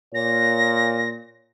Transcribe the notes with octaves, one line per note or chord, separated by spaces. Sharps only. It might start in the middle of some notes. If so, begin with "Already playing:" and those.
A#2 C#5 A#6